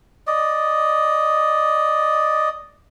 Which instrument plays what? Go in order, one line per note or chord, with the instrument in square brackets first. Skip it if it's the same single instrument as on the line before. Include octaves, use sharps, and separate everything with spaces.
[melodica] D5 D#5